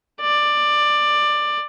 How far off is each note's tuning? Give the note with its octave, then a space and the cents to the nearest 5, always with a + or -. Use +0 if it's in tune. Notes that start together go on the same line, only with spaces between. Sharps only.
D5 +15